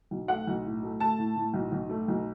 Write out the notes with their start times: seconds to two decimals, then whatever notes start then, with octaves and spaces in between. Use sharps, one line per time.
0.11 B1
0.28 A3 F#5
0.47 B1
0.65 A2
0.83 A3
1.00 A3 A5
1.18 A2
1.36 A2
1.54 B1
1.72 B1
1.89 A3
2.08 B1